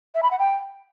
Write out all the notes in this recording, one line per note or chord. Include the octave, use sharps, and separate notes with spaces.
E5
B5
F#5
G5